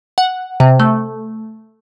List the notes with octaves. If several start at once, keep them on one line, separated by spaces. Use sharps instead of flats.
F#5
C3
A3